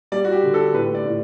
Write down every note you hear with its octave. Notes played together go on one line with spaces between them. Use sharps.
G3 D5
F#4
G4
D3
A4
A2 B4
D5
A2